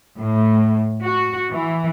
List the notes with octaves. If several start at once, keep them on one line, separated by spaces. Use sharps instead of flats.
A2
F#4
E3